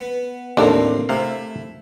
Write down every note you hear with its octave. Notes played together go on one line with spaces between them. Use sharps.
B3
A1 D#2 A2 A#3 C4 D4 A4 A#4
C3 A3 E4 F5